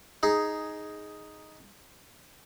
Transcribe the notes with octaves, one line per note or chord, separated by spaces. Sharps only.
D#4 G#4